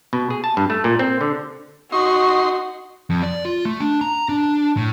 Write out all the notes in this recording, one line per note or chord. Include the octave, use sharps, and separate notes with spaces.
B2
G#4
A5
G2
A3
A#2
C4
D3
D#4 F#4 C6 C#6
F2
D5
F4
A3
D4
A#5
D4
A2